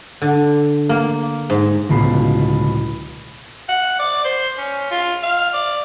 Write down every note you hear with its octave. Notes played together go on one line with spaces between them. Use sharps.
D3
A#3
G#2
D1 C#2 B2 B5 C7
F#5
D5
C5
C#4
F4
F5
D5